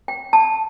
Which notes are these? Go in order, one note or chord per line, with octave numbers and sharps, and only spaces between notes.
G5
A5